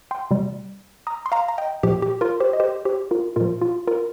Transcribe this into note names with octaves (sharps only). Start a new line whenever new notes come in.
G5 C6
C3 G3
A#5 D#6
C6
F5 A#5
A#5
D#5 G5
A#2 F3 G4
G4
F4 A#4
G4 C5
D#5
G4 C5
G4 C5
F4 A#4
A#2 F3 F4 A#4
F4
F4 A#4